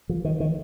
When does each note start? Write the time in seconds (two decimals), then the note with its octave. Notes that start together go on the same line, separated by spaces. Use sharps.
0.09 F3
0.25 D#3
0.40 D#3